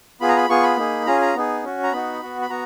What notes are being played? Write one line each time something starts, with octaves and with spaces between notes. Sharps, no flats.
B3 F4 G#4 B5
A#5
B5
B3 F4 G#4 C#6
B5
A#3 D#4 G#4
C#4 F4 G#4 A#5
A#5
B3 D#4 G#4
C#4 F#4
A#5
B3 D#4 F#4 B5
B3 F#4
B5
B3 F#4 A#5